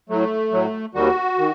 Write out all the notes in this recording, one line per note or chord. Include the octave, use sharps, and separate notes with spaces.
A2 F#3 A3
A2 F#3
D#2 D#3 G3 F#4
D#3